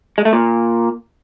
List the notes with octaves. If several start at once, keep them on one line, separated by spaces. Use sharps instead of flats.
G#3
A3
A#2